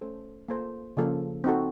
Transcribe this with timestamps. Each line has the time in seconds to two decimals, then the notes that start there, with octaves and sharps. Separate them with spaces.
0.01 A3 C#4 A4 C5
0.48 A#3 F4 A4 C5
0.97 C#3 F3 A#3 F4 A4
1.44 C4 D#4 F#4 A4